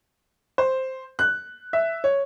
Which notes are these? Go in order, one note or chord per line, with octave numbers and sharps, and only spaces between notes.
C5
F#6
E5
C#5